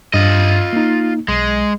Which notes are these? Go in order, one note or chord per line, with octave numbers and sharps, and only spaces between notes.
G2 F4 D#5
A#3 D#4
B1 G#3